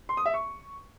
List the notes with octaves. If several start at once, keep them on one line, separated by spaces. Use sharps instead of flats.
C6
D#6
E5
C#6